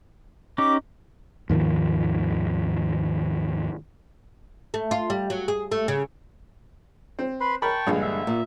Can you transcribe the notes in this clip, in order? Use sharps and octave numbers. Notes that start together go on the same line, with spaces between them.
C#4 D#4 G4 D6
D#2 G#2 D#3 F3
A3
F4
G3
F#3
G#4
A3
C#3
C4
B4 B5 C6
A#4 G5 A5 B5 C#6
A#1 G2 D3 G#3
E5
A#2